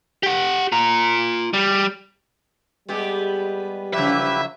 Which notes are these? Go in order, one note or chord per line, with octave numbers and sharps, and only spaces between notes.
G4 F#5
F4 A#5
G3
G3 G#3 B3 G4
C#3 F3 F#3 E4 G4 B4 E5